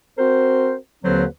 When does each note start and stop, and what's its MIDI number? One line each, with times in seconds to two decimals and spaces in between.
0.18 0.75 60
0.18 0.75 66
0.18 0.75 70
0.18 0.75 72
1.04 1.24 39
1.04 1.24 50
1.04 1.24 54
1.04 1.24 60
1.04 1.24 71
1.04 1.24 72